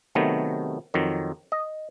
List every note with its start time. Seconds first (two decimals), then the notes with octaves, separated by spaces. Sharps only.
0.15 C3 D#3 F#3 A3 B3
0.94 F2 D#3 F#3
1.52 D#5